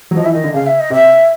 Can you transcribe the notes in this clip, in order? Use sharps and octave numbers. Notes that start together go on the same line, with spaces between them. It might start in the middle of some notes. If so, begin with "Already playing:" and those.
F#3
F3 D#5
E3 E5
D#3 D#5
D3
C#3 F5
E5
D#5
C3 E5